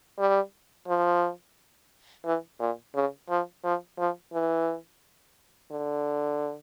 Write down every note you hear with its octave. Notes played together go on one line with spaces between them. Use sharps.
G3
F3
E3
A#2
C#3
F3
F3
F3
E3
D3